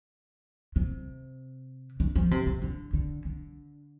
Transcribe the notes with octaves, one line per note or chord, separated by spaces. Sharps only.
C3
D3
F3
C3
C3
D3
D3
D3